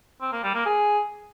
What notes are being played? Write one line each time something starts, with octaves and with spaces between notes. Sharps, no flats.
C4
A#3
G3
A#3
G#4